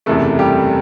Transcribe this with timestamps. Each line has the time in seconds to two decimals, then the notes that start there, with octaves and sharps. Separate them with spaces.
0.06 F#1 E2 C3 A3 A4
0.39 G3 G4